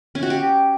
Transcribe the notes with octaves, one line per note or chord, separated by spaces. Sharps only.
C#4
F#4
G4